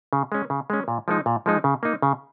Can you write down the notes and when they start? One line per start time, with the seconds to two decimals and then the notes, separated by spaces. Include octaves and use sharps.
0.13 C#3
0.32 G#3 C#4
0.50 C#3
0.70 G#3 C#4
0.88 A#2
1.08 F3 G#3 D#4
1.26 A#2
1.46 F3 G#3 D#4
1.64 C#3
1.83 A#3 D#4
2.02 C#3